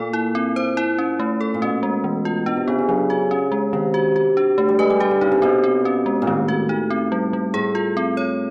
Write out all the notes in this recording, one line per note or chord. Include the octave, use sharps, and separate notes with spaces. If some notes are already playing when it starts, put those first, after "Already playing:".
Already playing: A#2 A4
E4
C4
C5
E4
C#4
A3
A4
A#2
B2 C#4
G#3
E3
F4
B2 D4
C3
C#3 B3
D3
C#3 F#3
F#4
C#4
G#3
C3 D#3
F#4
F#4
D4
D3 A3
G3
G#3 B4
G3
G3 G4
D3
C#3 D#4
C3
B2 C4
C4
C#4
G#3
A#2
A2 D#3
F#4
D#4
C4
G3
G3
A2 G#4
F4
C4
C#5